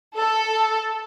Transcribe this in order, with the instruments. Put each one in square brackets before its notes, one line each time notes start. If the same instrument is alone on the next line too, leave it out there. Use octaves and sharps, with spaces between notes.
[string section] A4